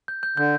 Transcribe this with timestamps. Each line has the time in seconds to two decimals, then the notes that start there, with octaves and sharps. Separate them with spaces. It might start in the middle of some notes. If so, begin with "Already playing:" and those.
0.08 G6
0.23 G6
0.37 D3 G6